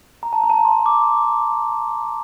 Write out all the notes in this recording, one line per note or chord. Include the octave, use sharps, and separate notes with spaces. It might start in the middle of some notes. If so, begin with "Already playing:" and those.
A#5
A5
A#5
A5
A#5
C6
D6